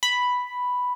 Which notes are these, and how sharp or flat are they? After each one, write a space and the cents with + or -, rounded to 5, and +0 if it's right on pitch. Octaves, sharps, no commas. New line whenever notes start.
B5 +0